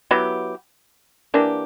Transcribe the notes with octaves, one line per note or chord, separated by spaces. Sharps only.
F#3 B3 E4 G4
E3 A#3 D4 G4